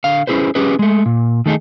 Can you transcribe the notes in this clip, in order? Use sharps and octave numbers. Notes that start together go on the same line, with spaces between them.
D3 F5
C#4 E4 G#4 B4 C5
C#4 G4 G#4 B4
G#3 A3
A#2
D#3 A3 D#4 G#4